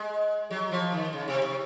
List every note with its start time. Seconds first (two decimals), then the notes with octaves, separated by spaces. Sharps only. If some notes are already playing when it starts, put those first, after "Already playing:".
Already playing: G#3
0.51 F#3
0.71 F3
0.92 D#3
1.13 C#3
1.28 C3
1.43 C3